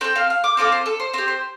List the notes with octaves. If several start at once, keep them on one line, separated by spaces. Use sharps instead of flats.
C4 A4 G5
F5
F5
D6
C4 F4 A4 D6
C5
A4
C5
C4 G4 C5
C5